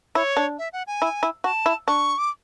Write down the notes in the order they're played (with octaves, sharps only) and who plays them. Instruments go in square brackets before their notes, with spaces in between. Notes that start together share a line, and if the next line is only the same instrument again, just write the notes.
[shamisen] E4 [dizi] C#5
[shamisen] D4
[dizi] E5
F#5
G#5
[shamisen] E4
E4
[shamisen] F#4 [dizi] A5
[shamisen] E4
[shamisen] D4 [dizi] C#6
[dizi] D6